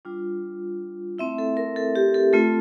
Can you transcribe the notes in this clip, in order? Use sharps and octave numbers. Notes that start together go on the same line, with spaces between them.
G3 D4 F4
A3 C4 E4 E5
A4
A#4
A4
G4
A4
A3 C4 F4 A4